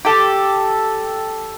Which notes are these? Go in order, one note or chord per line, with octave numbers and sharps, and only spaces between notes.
G4 A4